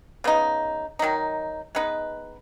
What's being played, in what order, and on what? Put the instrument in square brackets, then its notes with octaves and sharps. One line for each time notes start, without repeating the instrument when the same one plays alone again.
[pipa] C#3 B3 D#4
D#3 F#3 D#4
G#3 B3 D#4 B4